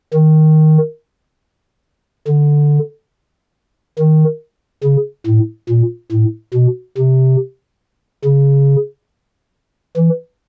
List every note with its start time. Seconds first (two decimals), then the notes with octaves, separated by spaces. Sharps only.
0.14 D#3
2.27 D3
3.99 D#3
4.84 C#3
5.26 A2
5.69 A#2
6.12 A2
6.54 B2
6.97 C3
8.25 C#3
9.97 E3